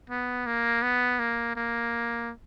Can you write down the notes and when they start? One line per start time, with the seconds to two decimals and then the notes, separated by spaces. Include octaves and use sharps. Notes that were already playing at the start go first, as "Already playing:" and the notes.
0.10 B3
0.46 A#3
0.82 B3
1.19 A#3
1.56 A#3